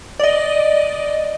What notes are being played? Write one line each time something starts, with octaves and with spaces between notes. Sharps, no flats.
D5 D#5